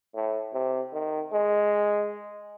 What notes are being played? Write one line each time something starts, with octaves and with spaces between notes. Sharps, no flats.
A2
C3
D#3
G#3